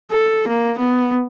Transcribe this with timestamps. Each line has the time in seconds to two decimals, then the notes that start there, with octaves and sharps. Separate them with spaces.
0.11 A4
0.48 A#3
0.79 B3